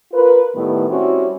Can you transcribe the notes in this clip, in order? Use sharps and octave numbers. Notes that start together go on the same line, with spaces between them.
F4 A#4 B4
A2 D#3 G3 A3 B3 E4
G3 C4 C#4 E4 F#4